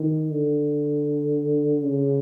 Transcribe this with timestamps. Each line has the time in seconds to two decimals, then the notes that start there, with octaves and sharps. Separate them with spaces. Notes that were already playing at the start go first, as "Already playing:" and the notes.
Already playing: D#3
0.30 D3
1.82 C#3